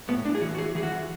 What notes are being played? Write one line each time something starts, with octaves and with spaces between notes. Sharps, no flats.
A2 B3
A2 D4
G#4
E3 F#4
F#4
E3 G#4
E3 G#4
F#4
E3